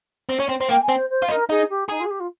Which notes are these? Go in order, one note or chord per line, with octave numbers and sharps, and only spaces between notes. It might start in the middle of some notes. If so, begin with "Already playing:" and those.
C4
C#4
C4
C4
A#3 G5
G#5
C4
C5
C5
F4
D#4 A#4
D#4 G#4
G4
D#4 G#4
F4
G#4
G4
F4